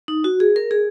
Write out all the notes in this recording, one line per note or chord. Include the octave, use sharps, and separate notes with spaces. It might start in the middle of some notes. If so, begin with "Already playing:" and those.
D#4
F#4
G#4
A#4
G#4